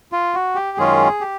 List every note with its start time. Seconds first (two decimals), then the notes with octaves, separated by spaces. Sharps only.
0.12 F4
0.34 F#4
0.55 G4
0.78 F#2 D#3 G#3 C#4 F4 G#4
1.21 G4